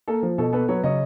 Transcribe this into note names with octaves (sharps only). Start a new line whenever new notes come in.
A#3 A4
F3
B2 A4
B3 A4 B4
F#3 B4 C#5
C#3 C#5 D#5